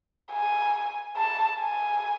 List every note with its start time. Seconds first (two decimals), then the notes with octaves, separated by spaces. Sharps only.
0.32 G#5
1.17 A5
1.60 G#5